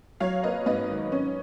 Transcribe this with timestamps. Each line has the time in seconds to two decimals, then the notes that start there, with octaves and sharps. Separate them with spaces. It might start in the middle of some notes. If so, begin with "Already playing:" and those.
0.20 F#3 C#5 F5
0.43 A#3 B4 D#5
0.66 G#2 B4 D#5
0.89 D#3
1.12 C#4